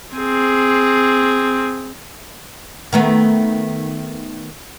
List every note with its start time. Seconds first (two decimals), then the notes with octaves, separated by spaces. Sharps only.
0.15 C4 G#4
2.93 D#3 A3 B3